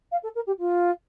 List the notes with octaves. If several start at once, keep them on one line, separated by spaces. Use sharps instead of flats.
F5
A4
A#4
G4
F4